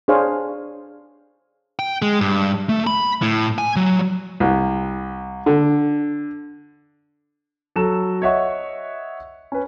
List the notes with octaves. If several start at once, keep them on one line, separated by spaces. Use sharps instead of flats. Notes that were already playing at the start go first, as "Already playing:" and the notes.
D4 G#4 C5 C#5 F5 G#5
G5
G#3
G2
A3
B5
A2
G#5
F#3
C2
D3
F#3 A4 E7
C#5 D#5 E5 F#5 C#6
C#4 B4